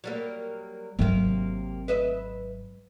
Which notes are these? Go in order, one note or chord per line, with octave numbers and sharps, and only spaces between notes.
F#3 G3 A#3
G#1 C3 F#3 A#3
B4 D#5 E5